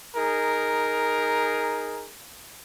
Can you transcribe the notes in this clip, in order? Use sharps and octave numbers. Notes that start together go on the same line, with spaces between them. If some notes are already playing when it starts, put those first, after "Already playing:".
D#4 G#4 A#4